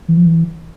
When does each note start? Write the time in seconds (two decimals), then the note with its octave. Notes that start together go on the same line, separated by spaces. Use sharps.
0.08 E3
0.17 F3
0.26 E3